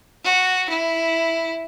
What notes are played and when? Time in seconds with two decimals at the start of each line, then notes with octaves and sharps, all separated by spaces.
0.24 F#4
0.69 E4